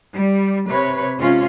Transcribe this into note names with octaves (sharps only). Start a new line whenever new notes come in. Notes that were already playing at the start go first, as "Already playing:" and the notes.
G3
C3 B4 C#5
C3 G#3 C#4 F4